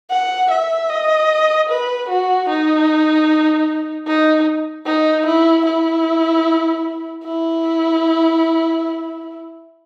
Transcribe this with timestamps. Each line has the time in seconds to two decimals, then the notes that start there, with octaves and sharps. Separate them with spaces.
0.10 F#5
0.51 E5
0.89 D#5
1.69 B4
2.09 F#4
2.49 D#4
4.07 D#4
4.86 D#4
5.26 E4
5.66 E4
7.24 E4